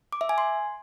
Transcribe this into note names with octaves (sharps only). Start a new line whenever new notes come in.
D6
E5
G#5
C6